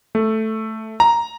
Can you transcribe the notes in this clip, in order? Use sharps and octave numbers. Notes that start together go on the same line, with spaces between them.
A3
A#5